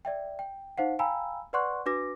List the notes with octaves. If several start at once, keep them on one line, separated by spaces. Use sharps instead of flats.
D5 E5 G5
G5
D#4 C5 F5 F#5
F5 G5 G#5 A#5 B5 E6
B4 D5 F#5 C6 C#6 F#6
D4 F#4 B4 D6 A#6